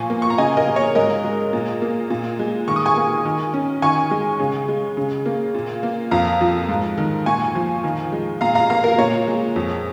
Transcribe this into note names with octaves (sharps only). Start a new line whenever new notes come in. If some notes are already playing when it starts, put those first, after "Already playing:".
Already playing: A#2 F3 G#5 C#6
A#3
C#6
A#5
C#3 D#5 G#5
A#4 D#5
A#3
C#5
G#2 A#4 D#5
G#3
A#2
A#3
A#2
G#3
D#3 C#6
D#6
G#5 C#6
A#3
D#3
C#4
D#3 G#5 C#6
G#3
C#3
G#3
C#3
A#3
A#2
A#3
F2 F5 A#5
F3
G#2
D#3
A#2 G#5 C#6
F3
D#3
G#3
A#2 F5 A#5
F5 A#5
A#3 F5 A#5
A#4
A#2 C#5
G#3
F2